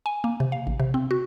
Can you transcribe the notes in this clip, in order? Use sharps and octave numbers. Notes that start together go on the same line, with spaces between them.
G#5
A#3
C3
F5
A1
C3
C4
F#4